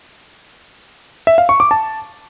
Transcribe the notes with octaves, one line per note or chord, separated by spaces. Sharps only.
E5
F5
C#6
D6
A5